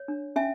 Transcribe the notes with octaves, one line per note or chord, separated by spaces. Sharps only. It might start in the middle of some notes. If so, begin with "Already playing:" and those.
Already playing: C#5
D4
C#4 E5 G#5